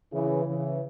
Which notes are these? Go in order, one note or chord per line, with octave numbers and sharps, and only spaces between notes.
C#3 E3
C#3 E3